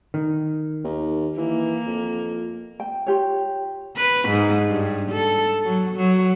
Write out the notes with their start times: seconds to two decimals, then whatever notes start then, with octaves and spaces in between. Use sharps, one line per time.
0.14 D#3
0.85 D#2
1.37 E3 A#3
1.87 F2
2.80 G5
3.06 F4 G4 C#5
3.97 B4
4.28 G#2
4.68 G2
5.12 A4
5.65 F#3
5.96 F#3